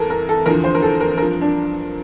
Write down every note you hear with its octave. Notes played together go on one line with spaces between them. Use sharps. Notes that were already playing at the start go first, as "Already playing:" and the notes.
Already playing: E2 E3 A4 A#4
A#4
A4
E2 D3 F3 A#4
C5
A#4
A4
A#4
G2 F3 A#4
D4